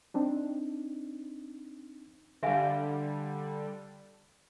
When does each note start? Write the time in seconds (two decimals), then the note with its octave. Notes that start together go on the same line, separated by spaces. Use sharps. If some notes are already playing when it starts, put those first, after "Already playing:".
0.14 C4 D4 D#4
2.43 D3 G3 E5 F5 G#5